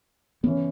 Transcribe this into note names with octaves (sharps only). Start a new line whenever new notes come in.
C#3 E3 B3 C#4